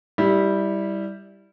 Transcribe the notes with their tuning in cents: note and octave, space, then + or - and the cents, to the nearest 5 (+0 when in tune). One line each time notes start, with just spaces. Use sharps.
G3 +0 E4 -15